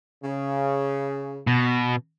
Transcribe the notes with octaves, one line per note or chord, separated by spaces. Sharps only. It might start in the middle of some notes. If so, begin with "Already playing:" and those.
C#3
B2